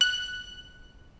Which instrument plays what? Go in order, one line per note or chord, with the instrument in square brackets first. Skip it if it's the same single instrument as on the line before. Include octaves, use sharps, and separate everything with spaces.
[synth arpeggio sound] F#6